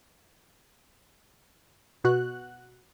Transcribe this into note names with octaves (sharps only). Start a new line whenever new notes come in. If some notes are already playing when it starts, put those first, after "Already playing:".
B2 F#4 F#6